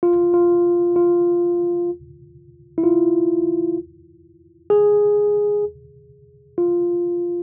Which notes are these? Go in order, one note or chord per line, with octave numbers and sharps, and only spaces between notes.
F4
F4
F4
E4
F4
G#4
F4